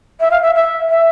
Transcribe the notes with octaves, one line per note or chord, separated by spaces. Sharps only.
E5
F5
E5
E5
E5